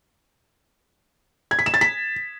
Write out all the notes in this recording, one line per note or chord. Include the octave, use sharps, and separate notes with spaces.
G#6
B6
E7
A6
B6